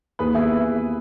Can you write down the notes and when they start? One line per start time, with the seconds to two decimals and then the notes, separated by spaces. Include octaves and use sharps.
0.19 D#2 G#4 B4
0.34 B3 E4 G#4